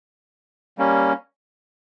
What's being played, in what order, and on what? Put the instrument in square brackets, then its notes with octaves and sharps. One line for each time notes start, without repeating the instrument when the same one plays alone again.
[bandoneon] G3 A#3 C#4